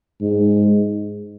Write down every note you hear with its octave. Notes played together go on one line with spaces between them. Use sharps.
G#2